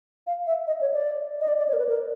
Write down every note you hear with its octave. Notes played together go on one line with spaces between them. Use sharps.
F5
E5
D#5
C#5
D5
D#5
D5
D5
C#5
A#4
B4
A#4